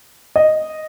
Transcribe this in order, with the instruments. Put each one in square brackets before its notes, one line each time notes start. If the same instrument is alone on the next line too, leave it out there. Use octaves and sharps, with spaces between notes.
[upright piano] D#5